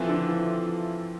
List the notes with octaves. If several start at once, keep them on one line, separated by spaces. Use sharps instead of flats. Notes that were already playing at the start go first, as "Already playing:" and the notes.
Already playing: E3 F3 C4 F4 A4 E5
D3
E3